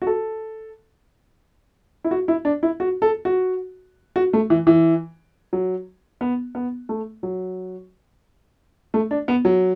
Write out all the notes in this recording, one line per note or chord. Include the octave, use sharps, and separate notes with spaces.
F#4
A4
E4
F#4
E4
D4
E4
F#4
A4
F#4
F#4
A3
E3
E3
F#3
B3
B3
A3
F#3
A3
D4
B3
F#3